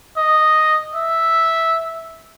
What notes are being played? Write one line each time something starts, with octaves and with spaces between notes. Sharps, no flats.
D#5
E5